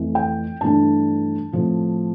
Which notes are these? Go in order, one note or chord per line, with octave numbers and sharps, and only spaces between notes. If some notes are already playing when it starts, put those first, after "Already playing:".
Already playing: F2 E3 A3
G5
G2 E3 A3 D4 A5
A2 F3 C4